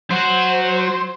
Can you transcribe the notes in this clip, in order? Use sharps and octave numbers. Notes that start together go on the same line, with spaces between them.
F#3 F#4 C5